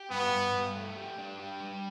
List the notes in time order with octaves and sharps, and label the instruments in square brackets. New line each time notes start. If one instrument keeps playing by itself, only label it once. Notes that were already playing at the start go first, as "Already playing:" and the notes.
Already playing: [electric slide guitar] G4
[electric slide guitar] G2 [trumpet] B3
[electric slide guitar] G2
G2
A3
G4
D4
G4
G3